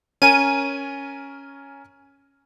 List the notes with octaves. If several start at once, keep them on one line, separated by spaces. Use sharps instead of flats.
C#4 A#4 G#5 D#7